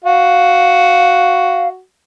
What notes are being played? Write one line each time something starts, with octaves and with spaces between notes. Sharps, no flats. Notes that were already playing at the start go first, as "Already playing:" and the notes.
F#4 F5